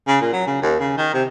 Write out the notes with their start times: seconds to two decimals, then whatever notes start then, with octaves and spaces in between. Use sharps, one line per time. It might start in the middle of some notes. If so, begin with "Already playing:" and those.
0.07 C#3
0.21 A#2
0.33 F#3
0.47 C#3
0.62 D#2
0.79 C#3
0.97 D#3
1.14 C3